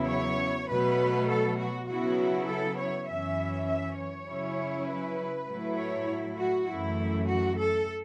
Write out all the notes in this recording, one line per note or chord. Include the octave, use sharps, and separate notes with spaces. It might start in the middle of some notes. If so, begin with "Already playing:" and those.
Already playing: E2 C#3 F#3 B3 E4
C#5
B2 F#3 A3 B4
A4
F#4
C#3 F#3 B3 E4 F#4
A4
C#5
F#2 E3 C#4 E5
E5
C#5
C#3 F#3 C#4 E4
B4
A2 F#3 A3 E4
C#5
F#4
F#2 E3 A3 E4
F#4
A4